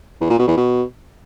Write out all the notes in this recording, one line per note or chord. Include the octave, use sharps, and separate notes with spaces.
E2
A#2
B2
E2
B2